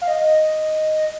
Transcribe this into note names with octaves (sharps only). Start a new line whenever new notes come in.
F5
D#5